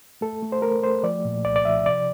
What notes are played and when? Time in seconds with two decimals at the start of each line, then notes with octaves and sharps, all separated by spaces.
0.21 A3 A4
0.43 A3
0.52 C5
0.62 A3 A#4
0.83 A3 C5
1.03 F3 D5
1.25 A#2
1.45 C2 D5
1.56 D5
1.65 F3 E5
1.85 C3 D5